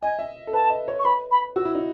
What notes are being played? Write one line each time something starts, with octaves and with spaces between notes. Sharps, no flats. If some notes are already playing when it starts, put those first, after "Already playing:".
D#5 G#5
E5
A4
B4 A5
D#5
C#5
C#6
B4 B5
B5
F#4 E6
E4
D#4